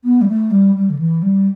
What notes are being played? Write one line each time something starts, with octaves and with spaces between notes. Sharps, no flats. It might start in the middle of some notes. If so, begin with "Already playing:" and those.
B3
G3
A3
G3
G3
D3
E3
G3